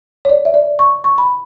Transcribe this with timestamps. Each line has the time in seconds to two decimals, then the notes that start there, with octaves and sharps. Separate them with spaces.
0.25 C#5
0.29 D5
0.45 E5
0.54 D5
0.79 C#6
1.04 C#6
1.18 B5